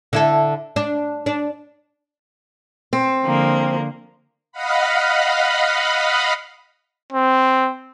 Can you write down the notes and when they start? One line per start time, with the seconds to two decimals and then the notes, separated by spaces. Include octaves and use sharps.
0.13 D3 E4 A4
0.76 D4
1.26 D4
2.93 C4
3.24 D3 F3 A#3
4.52 D#5 F5 F#5 B5
7.13 C4